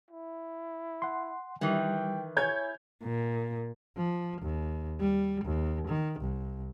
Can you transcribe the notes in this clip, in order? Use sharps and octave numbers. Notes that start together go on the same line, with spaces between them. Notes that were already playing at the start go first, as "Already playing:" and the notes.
E4
F#5 C6
D#3 E3 G3 G5
E4 C#5 G#5 G6 G#6
A#2
F3
D#2
G3
D#2
D#3
C2